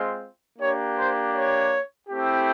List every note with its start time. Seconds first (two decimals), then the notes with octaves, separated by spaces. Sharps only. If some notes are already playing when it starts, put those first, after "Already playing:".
Already playing: G#3 C4 F4
0.58 A#3 D4 G4 C#5
0.96 C5
1.34 C#5
2.08 A3 C4 E4 G4